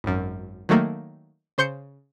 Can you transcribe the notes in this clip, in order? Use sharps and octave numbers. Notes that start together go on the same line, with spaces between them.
G#1 F#2
D#3 F#3 A3 A#3
C#3 C5 C6 G6 C#7